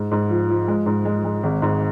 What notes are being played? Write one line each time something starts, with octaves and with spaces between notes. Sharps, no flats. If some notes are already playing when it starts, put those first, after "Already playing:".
Already playing: G#2
G#2
F3
F3
G#3
G#2
G#3
G#3
G#1
G#2